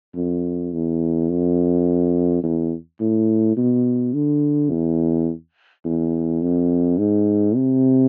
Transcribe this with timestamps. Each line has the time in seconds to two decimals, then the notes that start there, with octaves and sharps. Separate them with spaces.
0.15 F2
0.73 E2
1.30 F2
2.44 E2
3.00 A2
3.57 B2
4.14 D3
4.71 E2
5.85 E2
6.42 F2
6.98 G#2
7.56 C3